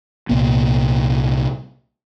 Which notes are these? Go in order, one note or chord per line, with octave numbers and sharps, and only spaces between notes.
C2 A#2 A#3 B3